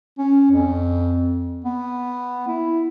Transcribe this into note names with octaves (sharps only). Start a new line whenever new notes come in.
C#4
F2
B3
E4